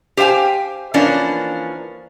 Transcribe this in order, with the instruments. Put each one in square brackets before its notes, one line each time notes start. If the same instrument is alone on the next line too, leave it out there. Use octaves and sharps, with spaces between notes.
[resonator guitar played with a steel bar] G4 C5 F5 G5 G#5
E3 F3 A#3 C#4 D4